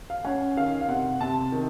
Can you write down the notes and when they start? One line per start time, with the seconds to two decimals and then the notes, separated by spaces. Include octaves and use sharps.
0.10 F5
0.25 C#4 F#5
0.57 D#3 F5
0.81 F5
0.88 C3 F#5
1.20 C3 A5
1.52 D#3